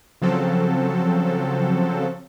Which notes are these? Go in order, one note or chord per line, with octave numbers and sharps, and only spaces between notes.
C#3 F3 F#3 C4 A4